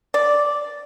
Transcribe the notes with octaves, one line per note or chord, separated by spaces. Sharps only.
D5